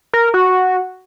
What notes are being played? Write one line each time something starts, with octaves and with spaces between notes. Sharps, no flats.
A#4
F#4